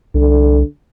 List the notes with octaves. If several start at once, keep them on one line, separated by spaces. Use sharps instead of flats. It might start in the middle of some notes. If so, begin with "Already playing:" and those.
C2 D3